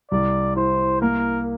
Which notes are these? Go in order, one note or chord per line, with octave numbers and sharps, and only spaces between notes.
C2 D5
E4 C5
A#3 A#4